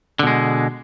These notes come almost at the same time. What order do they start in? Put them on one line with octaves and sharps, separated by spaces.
D3 B2 G#3